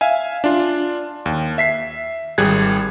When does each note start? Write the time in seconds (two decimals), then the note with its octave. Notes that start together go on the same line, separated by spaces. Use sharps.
0.01 E5 F5 G#5
0.44 D4 F4
1.26 D#2
1.58 E5 B6 C7
2.38 G#1 G3 G#4 F#6 G#6